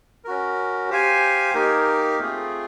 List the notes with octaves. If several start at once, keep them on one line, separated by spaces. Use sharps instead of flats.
C#4 F#4 A#4
G4 C5 F5 G#5
A#3 D#4 G4 A#4
A3 C4 F4 G#4